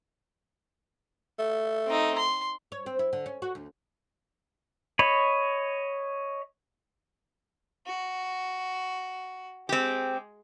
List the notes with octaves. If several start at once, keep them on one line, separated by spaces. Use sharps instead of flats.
A3
C4 D#4
C6
C#5
C4
E4
D3
C#4
F#4
D2
C#5 D#5 B5
F#4
G#3 C4 G4